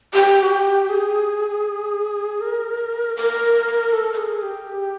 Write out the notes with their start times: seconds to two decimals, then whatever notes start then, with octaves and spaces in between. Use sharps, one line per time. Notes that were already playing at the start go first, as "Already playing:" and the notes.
0.14 G4
0.43 F#4
0.52 G4
0.89 G#4
2.41 A#4
3.16 A#4
3.92 A4
4.12 A4
4.18 G#4
4.42 G4